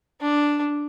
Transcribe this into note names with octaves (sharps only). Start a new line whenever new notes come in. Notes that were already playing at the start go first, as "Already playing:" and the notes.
D4